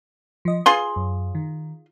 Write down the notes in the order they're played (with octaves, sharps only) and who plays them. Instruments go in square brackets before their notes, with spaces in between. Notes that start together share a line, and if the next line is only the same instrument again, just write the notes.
[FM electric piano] F3 D#5
[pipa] F4 G#4 C6 [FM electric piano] B4
[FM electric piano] F#2
D#3